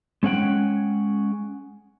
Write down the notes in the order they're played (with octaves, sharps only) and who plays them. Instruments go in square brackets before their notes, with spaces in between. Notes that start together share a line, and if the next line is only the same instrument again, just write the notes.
[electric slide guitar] G#3 C#4 G#4 F#5 G5